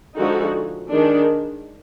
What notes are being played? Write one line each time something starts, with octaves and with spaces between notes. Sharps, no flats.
D3 F3 G#3 D#4 F#4
D#3 G#3 D4